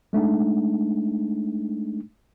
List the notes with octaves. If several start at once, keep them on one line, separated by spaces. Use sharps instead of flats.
G#3 A3 D4 D#4